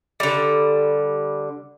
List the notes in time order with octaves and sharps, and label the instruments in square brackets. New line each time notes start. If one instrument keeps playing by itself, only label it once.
[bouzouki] D3 G3